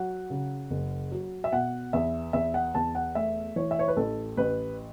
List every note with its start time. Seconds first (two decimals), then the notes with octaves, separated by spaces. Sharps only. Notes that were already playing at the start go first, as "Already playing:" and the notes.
Already playing: F#3 F#5
0.30 C#3
0.70 F#1
1.11 F#3
1.44 E5
1.52 B2 F#5
1.93 E2 E5
2.33 E2 E5
2.54 F#5
2.75 E2 A5
2.95 F#5
3.15 A3 E5
3.56 E3 C#5
3.71 E5
3.79 C#5
3.88 B4
3.97 A1 A4
4.37 A1 B4